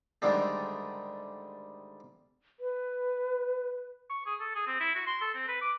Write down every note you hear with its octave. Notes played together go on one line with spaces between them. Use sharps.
G#2 D3 D#3 G3 A3
B4
C#6
G#4
A4
G#4
C4
E4
F#4
C6
A4
C4
B4
D6